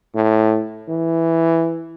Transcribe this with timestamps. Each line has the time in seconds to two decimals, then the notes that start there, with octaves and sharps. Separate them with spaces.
0.15 A2
0.89 E3